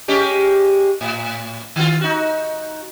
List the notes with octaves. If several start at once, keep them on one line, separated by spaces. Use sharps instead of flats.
G#3 C#4 G4
A2
D#3 F4
D#4 F#4